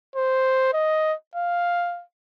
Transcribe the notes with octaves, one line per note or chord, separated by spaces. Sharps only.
C5
D#5
F5